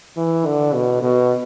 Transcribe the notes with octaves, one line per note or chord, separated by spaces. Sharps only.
E3
D3
B2
B2